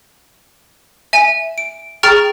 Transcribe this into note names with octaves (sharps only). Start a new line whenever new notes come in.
E5 G#5 E7
D7
G#4 G5 A#5 C#6 F6 A6